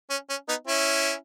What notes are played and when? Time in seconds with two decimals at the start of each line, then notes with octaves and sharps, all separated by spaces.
0.10 C#4
0.29 C#4
0.48 B3 D#4
0.67 C#4 E4